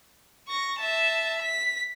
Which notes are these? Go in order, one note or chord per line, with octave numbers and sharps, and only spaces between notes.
C#6 A#6
E5 A5
B6